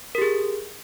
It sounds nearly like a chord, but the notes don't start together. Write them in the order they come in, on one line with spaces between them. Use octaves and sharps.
A#4 G4 G#4